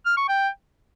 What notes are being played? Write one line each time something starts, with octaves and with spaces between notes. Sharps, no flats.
F6
C#6
G5